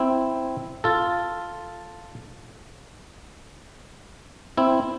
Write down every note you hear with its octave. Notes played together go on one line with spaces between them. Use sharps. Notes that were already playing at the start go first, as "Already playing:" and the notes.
Already playing: C4 E4
F4 A4
C4 E4